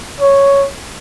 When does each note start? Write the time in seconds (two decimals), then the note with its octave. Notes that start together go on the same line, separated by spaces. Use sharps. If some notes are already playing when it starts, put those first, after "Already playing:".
0.20 C#5